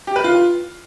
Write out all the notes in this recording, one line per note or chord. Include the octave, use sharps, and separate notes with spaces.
G4
B4
F4